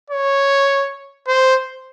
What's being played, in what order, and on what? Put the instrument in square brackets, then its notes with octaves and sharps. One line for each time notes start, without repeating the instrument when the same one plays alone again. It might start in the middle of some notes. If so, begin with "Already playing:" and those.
[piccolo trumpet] C#5
C5